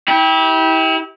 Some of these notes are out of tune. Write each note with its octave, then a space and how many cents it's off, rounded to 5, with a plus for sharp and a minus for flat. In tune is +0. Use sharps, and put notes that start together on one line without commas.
E4 -35 G4 +0